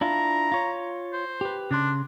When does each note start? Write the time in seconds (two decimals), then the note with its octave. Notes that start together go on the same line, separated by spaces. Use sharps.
0.01 D4 E4 F4 A#5
0.52 F4 C#5
1.12 C5
1.41 G4 B4
1.71 C#3 D4 C6